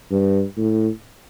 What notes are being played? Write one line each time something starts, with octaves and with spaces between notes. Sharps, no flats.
G2
A2